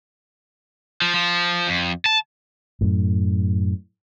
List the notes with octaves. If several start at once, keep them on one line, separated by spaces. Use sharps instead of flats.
F3
F3
F2
A5
F#2 A2